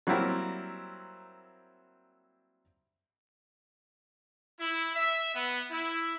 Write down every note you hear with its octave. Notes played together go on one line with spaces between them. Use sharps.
F#3 G3 A#3 C4 E4 A#4
E4
E5
B3
E4